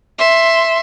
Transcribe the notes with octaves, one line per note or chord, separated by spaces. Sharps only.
E5 C6